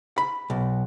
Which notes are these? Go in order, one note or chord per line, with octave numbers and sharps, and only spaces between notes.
B5
B1